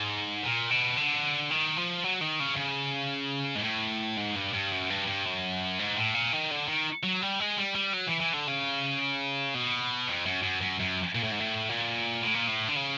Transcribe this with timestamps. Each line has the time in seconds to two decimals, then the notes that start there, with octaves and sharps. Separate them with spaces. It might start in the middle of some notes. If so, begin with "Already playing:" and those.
Already playing: G#2
0.43 A#2
0.70 B2
0.97 D3
1.50 D#3
1.77 F3
2.04 F#3
2.21 D#3
2.40 C#3
2.57 C#3
3.56 G#2
3.64 A2
4.17 G#2
4.36 G2
4.53 G2
4.72 F#2
4.90 G2
5.07 G2
5.25 F#2
5.79 G#2
5.96 A2
6.14 A#2
6.33 D#3
6.51 D3
6.68 D#3
7.04 F#3
7.22 G3
7.40 G#3
7.57 G3
7.76 G3
7.94 F#3
8.07 E3
8.20 E3
8.33 D3
8.47 C#3
9.54 B2
10.08 F2
10.26 F#2
10.43 F#2
10.61 F#2
10.80 F#2
11.15 A#2
11.24 A2
11.32 G#2
11.40 A2
11.69 A#2
12.22 A2
12.35 A#2
12.48 A2
12.68 D3
12.76 C#3